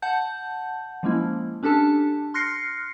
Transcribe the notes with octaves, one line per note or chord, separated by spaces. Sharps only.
F#5 A5 G6
F3 G#3 A#3 C#4 E4
C#4 D4 G4 A4 A5
C6 F6 F#6 A#6 C7 C#7